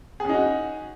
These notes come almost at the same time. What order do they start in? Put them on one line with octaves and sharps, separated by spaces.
G#4 C#4 D#4 F#4